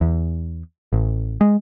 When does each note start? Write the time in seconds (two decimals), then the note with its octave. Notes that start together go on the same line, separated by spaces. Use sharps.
0.01 E2
0.93 A1
1.41 G#3